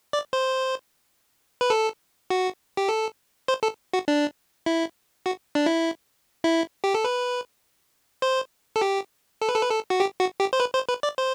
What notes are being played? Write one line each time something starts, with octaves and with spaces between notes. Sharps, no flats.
D5
C5
B4
A4
F#4
G4
A4
C5
A4
F#4
D4
E4
F#4
D4
E4
E4
G4
A4
B4
C5
A4
G4
A4
B4
A4
B4
A4
F#4
G4
F#4
G4
C5
B4
C5
B4
D5
C5